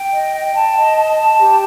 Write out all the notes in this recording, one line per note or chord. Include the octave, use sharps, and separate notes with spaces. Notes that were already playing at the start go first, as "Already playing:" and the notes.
Already playing: G5
D#5
G5
A5
D#5
A5
A5
G4